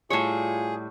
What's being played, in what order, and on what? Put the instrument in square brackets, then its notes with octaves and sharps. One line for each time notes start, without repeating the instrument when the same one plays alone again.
[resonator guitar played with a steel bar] A2 G3 [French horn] F4 [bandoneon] G#4 [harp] C#5